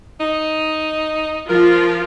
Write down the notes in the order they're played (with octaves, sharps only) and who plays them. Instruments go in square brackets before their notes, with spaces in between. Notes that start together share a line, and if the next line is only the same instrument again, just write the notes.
[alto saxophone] D#4
[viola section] F3 F4 [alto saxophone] A#4